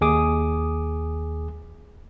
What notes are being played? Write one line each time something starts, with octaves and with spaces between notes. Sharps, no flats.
D#2 G#4 D6 D#6